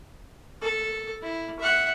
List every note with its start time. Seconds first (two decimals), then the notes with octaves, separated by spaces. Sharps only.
0.62 A4
1.22 E4
1.60 E5 F#5